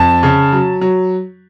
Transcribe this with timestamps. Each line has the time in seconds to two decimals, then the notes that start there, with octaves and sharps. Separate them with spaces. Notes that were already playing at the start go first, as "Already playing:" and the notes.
Already playing: F2 A5
0.23 C#3
0.52 F#3
0.81 F#3